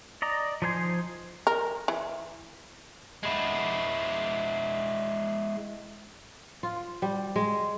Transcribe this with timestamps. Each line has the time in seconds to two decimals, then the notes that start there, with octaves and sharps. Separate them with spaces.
0.22 D5 D#5 A#5
0.62 F3 D#4 C5 G#5 C6
1.47 A#4
1.88 E3
3.23 G#3 E4
6.63 F4
7.02 G3
7.36 G#3